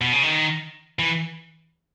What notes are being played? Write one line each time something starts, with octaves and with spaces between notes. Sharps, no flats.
B2
C#3
D#3
E3